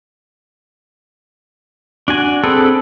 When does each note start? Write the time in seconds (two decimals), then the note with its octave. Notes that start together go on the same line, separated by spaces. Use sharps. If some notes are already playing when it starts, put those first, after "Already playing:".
2.08 D4 F#4 G#5
2.44 C4 G#4 A4 B4